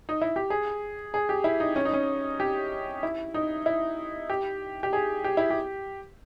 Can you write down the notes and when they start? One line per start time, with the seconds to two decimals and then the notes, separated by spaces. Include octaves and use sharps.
0.09 D#4
0.22 E4
0.36 G4
0.50 G#4
1.14 G#4
1.29 G4
1.44 E4
1.60 D#4
1.76 C#4
1.85 D#4
1.93 C#4
2.40 G4
3.03 E4
3.34 D#4
3.66 E4
4.30 G4
4.83 G4
4.93 G#4
5.24 G4
5.37 E4
5.50 G4